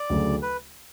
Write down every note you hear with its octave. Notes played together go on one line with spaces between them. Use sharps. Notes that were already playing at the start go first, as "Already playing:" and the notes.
Already playing: D5
D2 C#3 F#3 A3
B4